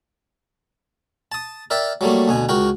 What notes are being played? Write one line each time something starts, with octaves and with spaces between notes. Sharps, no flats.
A5 D#6
A#4 D5 E5 G5
F#3 G3 A3 A#3
D2 B2 G#5
C#2 F#4 A#4 G5